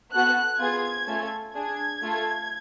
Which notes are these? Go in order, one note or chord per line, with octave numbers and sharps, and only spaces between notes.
B3 F#4 A4 F#6
B3 F4 G#4 G#6
A3 C#4 F4 A4
D4 G#4 G#6
A3 F4 A4